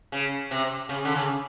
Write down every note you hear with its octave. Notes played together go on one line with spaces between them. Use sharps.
C#3
C3
C#3
D3
C#3